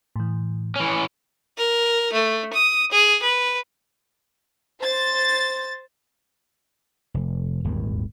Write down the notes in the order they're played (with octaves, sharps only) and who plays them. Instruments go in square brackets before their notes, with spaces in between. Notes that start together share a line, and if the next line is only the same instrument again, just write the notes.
[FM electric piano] A2 E3
[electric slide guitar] E3 C#4
[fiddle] A#4
A3
D#6
G#4
B4
[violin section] C5 A6
[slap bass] F1
D#1 G#1 E2